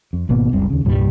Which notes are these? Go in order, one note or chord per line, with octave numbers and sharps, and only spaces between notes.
F2
G#1 B2 A#3 B3
F#1 C#2 G3 C4
D#2 C#3
C2 G2 A#2 G3